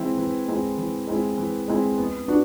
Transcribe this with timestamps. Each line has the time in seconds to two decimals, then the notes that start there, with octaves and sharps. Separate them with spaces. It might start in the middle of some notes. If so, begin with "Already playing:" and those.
Already playing: E3 G#3 C4 E4
0.17 E3
0.48 G#3 C4 E4
0.78 E3
1.07 G#3 C4 E4
1.38 E3
1.68 G#3 C4 E4
1.98 B3
2.28 D4 F#4 B4